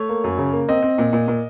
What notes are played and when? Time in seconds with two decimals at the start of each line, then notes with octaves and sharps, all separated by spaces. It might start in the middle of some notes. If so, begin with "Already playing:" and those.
Already playing: A3 C#5
0.09 A#3
0.24 F#2
0.38 C#3
0.53 A#3
0.69 C4 D#5
0.82 C4
0.98 A#2
1.13 A#2
1.28 A#2